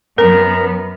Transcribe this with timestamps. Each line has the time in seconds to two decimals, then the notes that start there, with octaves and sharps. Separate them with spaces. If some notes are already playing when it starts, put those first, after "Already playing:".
0.18 F#2 B3 A#4 A#5 F6